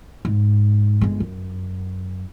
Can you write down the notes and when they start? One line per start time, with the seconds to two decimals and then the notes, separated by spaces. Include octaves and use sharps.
0.25 G#2
1.01 G1 G#3
1.20 F#2